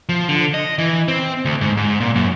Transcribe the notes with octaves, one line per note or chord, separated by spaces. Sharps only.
F3
D3
D#5
E3
C4
D2
G#2
G#2
A#2
F#2